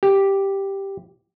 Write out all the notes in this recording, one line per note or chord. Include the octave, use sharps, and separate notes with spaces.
G4